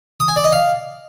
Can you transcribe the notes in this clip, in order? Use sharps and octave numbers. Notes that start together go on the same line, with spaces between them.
D#6
G#5
D5
D#5
F5